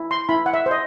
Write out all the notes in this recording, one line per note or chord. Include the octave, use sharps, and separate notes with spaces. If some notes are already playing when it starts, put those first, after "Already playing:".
Already playing: E4
C6
E4 B5
F#5
E5
C5
D#5